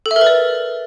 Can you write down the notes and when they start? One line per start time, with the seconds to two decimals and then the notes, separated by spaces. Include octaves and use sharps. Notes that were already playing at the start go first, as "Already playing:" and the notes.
0.06 A4
0.11 E5
0.16 A#4
0.21 B4
0.27 D5